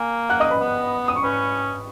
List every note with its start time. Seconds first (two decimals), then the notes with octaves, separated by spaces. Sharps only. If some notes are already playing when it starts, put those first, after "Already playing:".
Already playing: A#3 G#5
0.29 F#5 F#6
0.40 D#5 D#6
0.50 B4 B5
0.61 B3
1.08 D#6
1.16 C#6
1.23 C#4 B4 B5